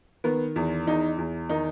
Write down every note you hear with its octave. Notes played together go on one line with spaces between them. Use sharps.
D#3 B3
E2
E2 D#4
E2
D#3 D#4